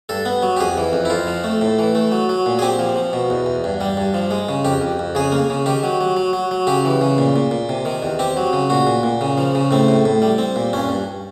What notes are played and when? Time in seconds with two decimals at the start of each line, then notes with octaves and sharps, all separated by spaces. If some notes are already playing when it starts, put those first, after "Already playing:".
0.09 G2 A4
0.26 B3
0.42 F#3
0.57 G4
0.60 F2 G#4
0.77 E3
0.93 F2
1.05 E4
1.10 F2 F4
1.27 F3
1.44 A3
1.61 A2
1.79 E3
1.95 A3
2.12 F#3
2.29 F#3
2.46 A#2
2.59 G#4
2.62 C4 G4
2.79 F3
2.96 F3
3.13 B2
3.30 E2
3.46 E2
3.64 G2
3.81 G3
3.97 G2
4.14 F3
4.31 G#3
4.49 C#3
4.65 F2 G4
4.81 F2
4.99 F2
5.15 C#3 G#4
5.32 A#3
5.50 C#3
5.66 D#3 G4
5.83 F#3
6.01 F#3
6.17 F#3
6.33 F#3
6.51 F#3
6.67 C#3 G4
6.85 E3
7.01 C#3
7.18 A#2
7.36 A#2
7.51 A#2
7.69 C3
7.85 D#3
8.03 E2
8.19 C4 G4
8.37 F#3
8.53 C#3
8.70 A#2 F#4
8.87 A#2
9.03 A#2
9.21 C#3
9.38 F3
9.55 C#3
9.71 A2 C4
9.88 A2
10.05 A2
10.22 G3
10.38 C4
10.56 A#2
10.73 G2 C#4
10.89 G2